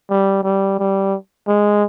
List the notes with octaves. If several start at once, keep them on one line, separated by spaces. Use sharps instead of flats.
G3
G3
G3
G#3